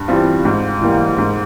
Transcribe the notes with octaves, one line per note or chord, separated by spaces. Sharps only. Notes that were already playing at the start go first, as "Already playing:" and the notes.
Already playing: G2
E3 G3 C4 F4
G#2
E3 G3 A#3
G#2